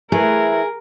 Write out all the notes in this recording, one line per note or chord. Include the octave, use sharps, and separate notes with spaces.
E3 A3 G#4 A#4